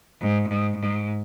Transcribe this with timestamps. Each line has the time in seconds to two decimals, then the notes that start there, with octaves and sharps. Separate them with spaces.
0.21 G#2
0.49 G#2
0.77 G#2